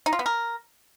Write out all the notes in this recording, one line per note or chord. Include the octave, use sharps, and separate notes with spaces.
D#4
F4
B3
A#4